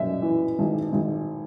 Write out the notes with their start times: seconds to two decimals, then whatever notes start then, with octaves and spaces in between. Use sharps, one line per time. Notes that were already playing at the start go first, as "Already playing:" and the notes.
Already playing: F#2 E5
0.22 E3
0.59 G#1
0.93 G#1